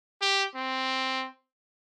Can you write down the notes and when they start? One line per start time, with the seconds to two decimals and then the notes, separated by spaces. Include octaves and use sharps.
0.21 G4
0.55 C4